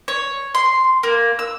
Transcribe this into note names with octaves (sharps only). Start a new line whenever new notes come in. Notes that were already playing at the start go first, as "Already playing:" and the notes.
C#5
C6
A#3
E6